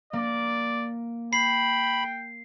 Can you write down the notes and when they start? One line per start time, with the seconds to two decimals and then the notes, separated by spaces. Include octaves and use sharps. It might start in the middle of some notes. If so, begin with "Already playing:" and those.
0.13 A#3 D5
1.33 G5 B5 C7